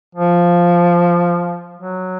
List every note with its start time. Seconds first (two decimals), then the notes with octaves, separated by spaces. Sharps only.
0.15 F3
1.77 F#3